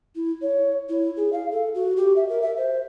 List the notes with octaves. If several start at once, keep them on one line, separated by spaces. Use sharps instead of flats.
E4
C#5
E4
G#4
F5
A4
F#4
G4
E5
A#4
E5
C5